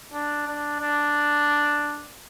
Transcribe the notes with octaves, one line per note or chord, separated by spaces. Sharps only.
D4
D4
D4